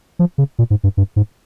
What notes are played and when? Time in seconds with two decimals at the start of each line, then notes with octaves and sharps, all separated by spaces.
0.19 F3
0.38 C#3
0.59 A#2
0.70 G#2
0.84 G2
0.97 G2
1.16 G#2